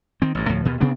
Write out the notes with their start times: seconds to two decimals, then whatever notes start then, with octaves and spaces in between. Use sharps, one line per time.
0.22 D#3 C4
0.35 A1 G2
0.49 D2 A2 F3
0.65 D#2 B2
0.80 C3 B3 C4 D4